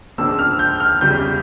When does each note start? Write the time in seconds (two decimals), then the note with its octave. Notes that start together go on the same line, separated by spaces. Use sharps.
0.18 C#2 C#3 F3 A#3 D4 E6
0.39 F6
0.59 G6
0.80 F6
1.01 E2 C#3 G3 G6